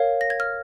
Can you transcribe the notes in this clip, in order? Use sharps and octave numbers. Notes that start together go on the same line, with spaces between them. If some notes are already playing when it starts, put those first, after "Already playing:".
Already playing: A#4 C#5 F5
A#6
G#6
F6